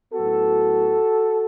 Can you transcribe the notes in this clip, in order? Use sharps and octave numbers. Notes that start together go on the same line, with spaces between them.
A2 F#3 B3 F#4 A4